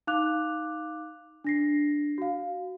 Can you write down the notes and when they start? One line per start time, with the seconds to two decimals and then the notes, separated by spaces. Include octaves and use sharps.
0.07 D#4 F5 D6 F#6 F7
1.44 D4 A#6 C7
2.18 F#4 F5